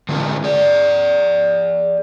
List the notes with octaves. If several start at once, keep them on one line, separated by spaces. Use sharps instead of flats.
D3 G#3 C#4 F4 G4 A#4
G#4 D5